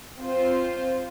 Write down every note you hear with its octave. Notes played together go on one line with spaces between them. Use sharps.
C4 F4 C5